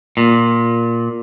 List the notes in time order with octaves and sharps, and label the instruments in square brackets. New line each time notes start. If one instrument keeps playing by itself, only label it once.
[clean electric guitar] A#2